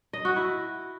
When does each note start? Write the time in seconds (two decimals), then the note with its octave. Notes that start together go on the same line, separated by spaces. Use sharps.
0.13 D#5
0.25 F#4
0.36 E4